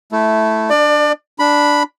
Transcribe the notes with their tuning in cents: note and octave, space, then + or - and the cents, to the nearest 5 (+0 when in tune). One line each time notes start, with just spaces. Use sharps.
A3 -5 E4 +0
D4 +0 D5 +30
D4 +0 B5 +0